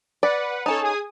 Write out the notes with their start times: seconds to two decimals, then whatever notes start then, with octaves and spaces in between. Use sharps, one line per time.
0.23 B4 D5 F#5
0.66 C#4 D#4 A4 C#5 A5
0.82 G#4 G#5 D#6